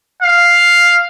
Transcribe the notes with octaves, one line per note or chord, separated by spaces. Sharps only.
F5